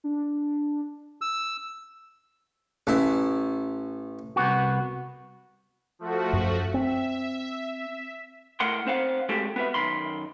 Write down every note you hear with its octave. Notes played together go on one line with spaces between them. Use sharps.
D4
E6
A1 E4
C2 B3 F#4
F3 A3 F#4
F#2
C4 E5
A2 A#4 F#5 C6
C4 C5 F5 F#5
G#3 A3 C4 F#4 G4 A4
B3 B4 E5
F#2 D#3 B5 C6